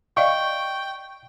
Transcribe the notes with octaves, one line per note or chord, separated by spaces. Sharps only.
D5 D#5 F5 G5 C#6